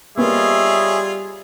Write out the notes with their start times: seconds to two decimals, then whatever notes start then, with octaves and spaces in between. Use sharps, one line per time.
0.18 G3 A#3 B3 F4 G#4 C#5 D#5 E5